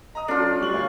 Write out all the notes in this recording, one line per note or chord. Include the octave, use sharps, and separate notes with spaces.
D#5 A#5 D#6
F#3 C#4 D4 F4 A4 D5
G3 C#6 F#7
D2 C#5 F5